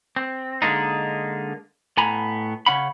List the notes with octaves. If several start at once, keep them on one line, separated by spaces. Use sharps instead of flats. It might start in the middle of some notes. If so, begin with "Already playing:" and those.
C4
D3 G#3 A#3 D4 D#4
A2 B3 G#5 A#5 B5
C#3 C#4 F#5 B5